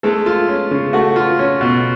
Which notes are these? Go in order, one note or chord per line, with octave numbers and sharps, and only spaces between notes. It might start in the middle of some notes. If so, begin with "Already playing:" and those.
G#3 A3 A4
F4
C#4
C#3
A3 F#4
F4
C#4
B2